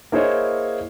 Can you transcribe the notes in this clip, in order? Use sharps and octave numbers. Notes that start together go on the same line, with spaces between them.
A#3 E4 G#4 C5 C#5 D#5